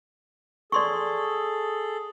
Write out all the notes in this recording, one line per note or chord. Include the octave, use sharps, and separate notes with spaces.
G#4 A4 D5 C6 C#6